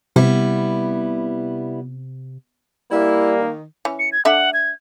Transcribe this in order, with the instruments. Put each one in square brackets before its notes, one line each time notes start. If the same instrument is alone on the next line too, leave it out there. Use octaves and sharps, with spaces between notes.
[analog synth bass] C3 [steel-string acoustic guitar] G3 B3 E4
[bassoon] G3 [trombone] A#3 [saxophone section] E4
[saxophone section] D#3
[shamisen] E3 C#4
[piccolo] C#7
G#6
[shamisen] A3 D4 E5 [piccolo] F#5
[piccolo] G#6